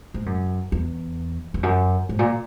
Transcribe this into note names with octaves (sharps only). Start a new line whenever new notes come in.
G#2
F#2
E2
E2
F#2
G#2
A#2